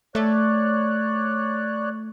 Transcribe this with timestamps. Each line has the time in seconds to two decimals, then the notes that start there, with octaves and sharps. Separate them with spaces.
0.15 A3 C#5 D5 F#6